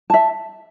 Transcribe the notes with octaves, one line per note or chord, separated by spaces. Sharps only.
E5 A5